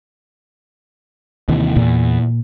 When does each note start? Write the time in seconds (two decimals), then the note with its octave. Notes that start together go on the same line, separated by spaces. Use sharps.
1.49 D#2 C3 E3
1.76 E2 A#2